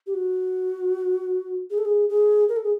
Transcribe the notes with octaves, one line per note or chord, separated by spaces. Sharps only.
G4
F#4
G#4
A4
G#4
G#4
A#4
A4
G#4